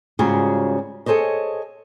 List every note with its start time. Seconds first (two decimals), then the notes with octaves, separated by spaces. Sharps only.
0.19 G#2 C#3 G3 F4 F#4 G#4
1.06 G#4 A4 C5 C#5 D#5